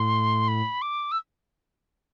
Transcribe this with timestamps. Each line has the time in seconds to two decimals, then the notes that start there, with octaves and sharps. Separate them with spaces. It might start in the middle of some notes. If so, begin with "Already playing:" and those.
Already playing: A2 C6
0.48 B5
0.82 D6
1.12 E6